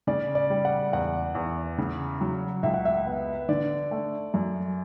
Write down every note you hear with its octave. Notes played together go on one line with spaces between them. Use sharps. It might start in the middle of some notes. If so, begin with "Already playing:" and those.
C#3 D5
D5
G3
F#5
E2 F#5
E2
C#3
F#3
C#2 E5
F#5
E5
B3
D3 D5
A3
F#2